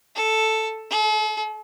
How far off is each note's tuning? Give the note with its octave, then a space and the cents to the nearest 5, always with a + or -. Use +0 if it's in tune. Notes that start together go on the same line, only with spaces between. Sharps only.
A4 +0
A4 -45